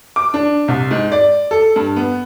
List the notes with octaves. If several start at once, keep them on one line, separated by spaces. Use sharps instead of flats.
D6
D4
C2
G#2
D5
A4
G2
B3